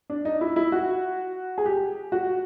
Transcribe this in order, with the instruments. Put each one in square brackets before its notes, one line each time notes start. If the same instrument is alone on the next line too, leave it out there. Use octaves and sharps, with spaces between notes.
[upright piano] D4
D#4
E4
E4
F#4
G#4
G4
F#4